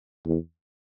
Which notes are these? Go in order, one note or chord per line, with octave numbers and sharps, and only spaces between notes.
E2